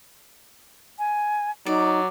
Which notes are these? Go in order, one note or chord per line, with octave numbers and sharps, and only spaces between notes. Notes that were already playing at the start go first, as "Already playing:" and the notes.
G#5
F#3 D#4 D5